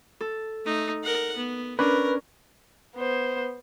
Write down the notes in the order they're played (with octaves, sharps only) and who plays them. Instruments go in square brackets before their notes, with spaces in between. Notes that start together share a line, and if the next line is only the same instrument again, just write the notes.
[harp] A4
[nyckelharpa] A3 D#4
A#4 F#5
B3
[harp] C#4 D4 [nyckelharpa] A#4 [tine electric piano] B4
[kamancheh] B3 C5